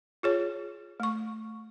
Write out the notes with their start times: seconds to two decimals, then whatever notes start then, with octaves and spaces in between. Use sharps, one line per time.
0.23 F4 G#4 C#5
1.00 A3 C#6